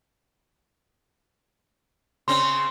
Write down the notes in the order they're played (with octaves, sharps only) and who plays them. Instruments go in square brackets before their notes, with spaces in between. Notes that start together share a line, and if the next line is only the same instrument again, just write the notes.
[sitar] C#3 C4 C#4 [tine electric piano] C6